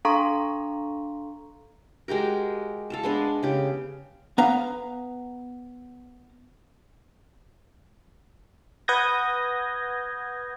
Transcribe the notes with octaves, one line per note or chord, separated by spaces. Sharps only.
D4 A4 F5 A#5 C6 C#6
G#3 F#4 G4 A#4
A4 F5 A5
G#3 B3 D4
C#3 G4
B3 F5 A#5
B4 F#5 D#6 G6 G#6 A#6